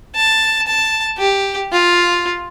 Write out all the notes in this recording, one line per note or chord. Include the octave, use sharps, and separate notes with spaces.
A5
A5
G4
F4